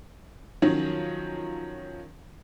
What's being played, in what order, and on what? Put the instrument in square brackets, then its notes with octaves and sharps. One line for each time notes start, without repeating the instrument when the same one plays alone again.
[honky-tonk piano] D#3 F3 F#3 C#4